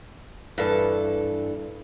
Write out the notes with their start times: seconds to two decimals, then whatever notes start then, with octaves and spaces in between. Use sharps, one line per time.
0.58 G2 E3 A4